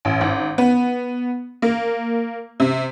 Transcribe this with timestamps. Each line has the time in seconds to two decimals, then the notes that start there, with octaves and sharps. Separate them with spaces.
0.05 A1
0.21 G#1
0.58 B3
1.62 A#3
2.60 C3